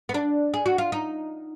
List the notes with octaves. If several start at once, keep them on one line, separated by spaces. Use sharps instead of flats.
B3
D4
G#4
F#4
F4
D#4